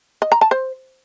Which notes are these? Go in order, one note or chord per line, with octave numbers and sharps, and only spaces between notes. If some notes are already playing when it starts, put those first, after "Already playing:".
D#5
A#5
A5
C5